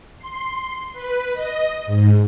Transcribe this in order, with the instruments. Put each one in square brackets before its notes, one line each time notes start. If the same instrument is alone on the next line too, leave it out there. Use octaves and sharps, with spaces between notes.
[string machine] C6
B4
D#5
G#2